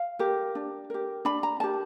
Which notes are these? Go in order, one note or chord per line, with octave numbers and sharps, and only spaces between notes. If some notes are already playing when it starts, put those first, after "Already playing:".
Already playing: F5
G4 A#4
D4
G4 A#4
D4 B5
A#5
G4 A#4 A5